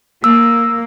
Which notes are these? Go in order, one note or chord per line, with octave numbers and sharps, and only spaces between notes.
A#3 E6